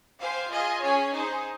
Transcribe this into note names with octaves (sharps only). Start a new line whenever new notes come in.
G4 C5 F5 G#5
F4 G#4 D#5 G#5
C#4 G#4 C#5 G#5
D#4 G#4 C5